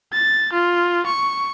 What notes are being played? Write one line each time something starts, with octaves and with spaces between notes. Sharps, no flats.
A6
F4
C#6